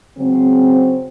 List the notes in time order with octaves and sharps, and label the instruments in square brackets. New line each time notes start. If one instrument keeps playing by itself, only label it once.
[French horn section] C#3 F#3 G#3 C4